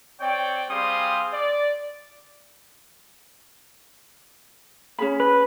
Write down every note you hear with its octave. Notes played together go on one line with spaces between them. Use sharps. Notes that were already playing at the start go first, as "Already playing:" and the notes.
C4 C#5 D5 G5
G3 C4 G#4 F5 C6 D#6
D5
C#4 G#4 B5
B4